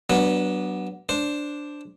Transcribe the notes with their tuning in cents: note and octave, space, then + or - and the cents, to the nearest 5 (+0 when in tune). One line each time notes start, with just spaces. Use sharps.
F#3 +30 B3 -10 D4 +0
D4 +0 C5 +0